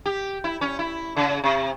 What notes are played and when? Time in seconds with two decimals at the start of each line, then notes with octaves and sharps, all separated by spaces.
0.06 G4
0.44 E4
0.61 C#4
0.79 E4
1.17 C#3
1.44 C3